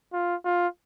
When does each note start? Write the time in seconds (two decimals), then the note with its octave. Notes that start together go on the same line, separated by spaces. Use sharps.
0.13 F4
0.45 F4